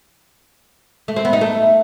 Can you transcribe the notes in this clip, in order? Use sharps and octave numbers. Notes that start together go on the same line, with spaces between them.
A3
C4
B3
D#4
A3